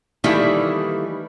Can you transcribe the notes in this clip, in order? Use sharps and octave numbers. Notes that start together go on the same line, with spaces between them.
D#3 E3 G3 A3 A#3 E4